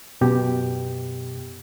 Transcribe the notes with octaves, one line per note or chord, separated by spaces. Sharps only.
F#2 B2 G4